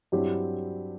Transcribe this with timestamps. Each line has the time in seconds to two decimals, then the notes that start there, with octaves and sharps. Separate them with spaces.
0.12 G2 F#3 C4 E4 G4